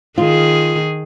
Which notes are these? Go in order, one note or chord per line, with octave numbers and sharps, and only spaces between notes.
D#3 F4 G#4